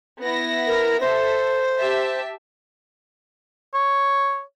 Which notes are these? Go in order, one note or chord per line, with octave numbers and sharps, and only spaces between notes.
B3 E4 A#6
A#4
A4 C5 E5
G4 E5 A5
C#5